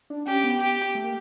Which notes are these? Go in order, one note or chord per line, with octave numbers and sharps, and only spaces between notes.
D4
C#4 G4
B3
G4
A3
A#3